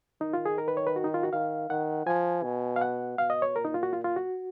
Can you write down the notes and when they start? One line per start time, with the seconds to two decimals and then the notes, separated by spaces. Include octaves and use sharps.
0.21 D#3 D#4
0.33 F4
0.46 G#4
0.58 A#4
0.68 B4
0.77 C#5
0.87 B4
0.96 F#4
1.04 D#4
1.14 F4
1.23 F#4
1.33 D#3 F5
1.70 D#3 F#5
2.06 F3 G#5
2.44 B2
2.76 F5
2.82 F#5
3.18 B2 F5
3.30 D#5
3.42 C#5
3.55 A#2 A#4
3.65 D#4
3.74 F4
3.83 F#4
3.93 F4
4.04 F4
4.16 F#4